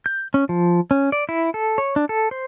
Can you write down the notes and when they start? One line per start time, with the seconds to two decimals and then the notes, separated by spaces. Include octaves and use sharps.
0.06 G6
0.34 C#4
0.49 F3
0.91 C#4
1.12 D5
1.29 E4
1.54 A4
1.78 C#5
1.96 D4
2.09 A4
2.31 C5